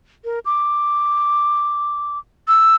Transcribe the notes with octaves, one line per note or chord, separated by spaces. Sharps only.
A#4
D6
E6